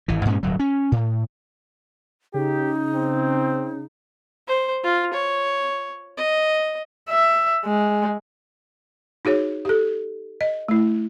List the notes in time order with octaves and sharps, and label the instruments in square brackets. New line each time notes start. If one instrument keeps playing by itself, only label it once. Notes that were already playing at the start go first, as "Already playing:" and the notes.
[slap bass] G#1 E3
G2 A#2 G#3 C#4
D1 G1 F#3
C#4
A2
[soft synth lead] C#3 [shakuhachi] D#4 [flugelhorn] G4
[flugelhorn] C4
[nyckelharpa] C5
F4
C#5
D#5
[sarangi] E5
G#3
[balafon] D#4 F#4 G#4 C#5
G4 A4
D#5
A3 E4